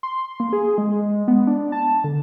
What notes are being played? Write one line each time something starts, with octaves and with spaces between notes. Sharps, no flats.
C6
A#3
G#4
G#3
B3
D4
A5
D3